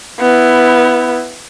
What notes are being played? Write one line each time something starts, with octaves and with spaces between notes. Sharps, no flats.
B3 E4